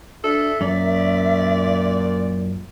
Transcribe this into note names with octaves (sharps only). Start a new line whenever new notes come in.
D4 A4 E5
F#2 A#2 D5